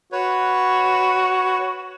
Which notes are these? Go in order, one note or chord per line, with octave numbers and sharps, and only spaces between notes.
F#4 B4 C#5